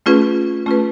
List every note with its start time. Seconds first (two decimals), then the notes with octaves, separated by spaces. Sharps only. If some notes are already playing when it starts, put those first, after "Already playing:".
0.06 A3 C#4 F4 G#4 B4
0.66 A3 C#4 F4 G#4 B4